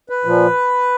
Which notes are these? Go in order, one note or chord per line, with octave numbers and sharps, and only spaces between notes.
B4
A#2 F3